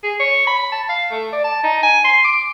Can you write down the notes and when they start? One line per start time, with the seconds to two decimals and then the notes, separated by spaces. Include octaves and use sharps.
0.04 G#4
0.19 C#5
0.47 B5
0.72 A5
0.89 F5
1.11 A3
1.33 D5
1.44 A5
1.63 D#4
1.83 G#5
2.05 C6
2.24 D6